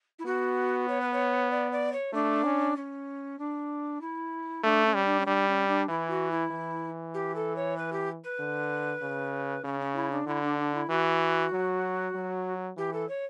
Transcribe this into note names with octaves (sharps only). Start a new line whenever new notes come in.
E4
B3 F#4
C#5
B4
C#5
D5
D5
C#5
A3 D4
C#4
C#4
D4
E4
A3 D4
C#4
G3
D4
C#4
G3 D4
C#4
D4
E3 E4
F#4
E4
E3
G4
A4
C#5
B4
G4
B4
D3
C#3
C#3 C#4
C#4
E4
D4
D3 E4
D4
D4
E4
E3 F#4
F#3
F#3
E3 G4
A4
C#5